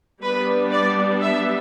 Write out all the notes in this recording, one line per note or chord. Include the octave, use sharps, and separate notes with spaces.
G3 B3 D4 B4
D5
E5